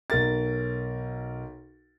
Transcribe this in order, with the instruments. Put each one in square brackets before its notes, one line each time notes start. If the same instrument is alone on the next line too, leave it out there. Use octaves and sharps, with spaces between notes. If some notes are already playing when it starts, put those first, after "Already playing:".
[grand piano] B1 A#4 A6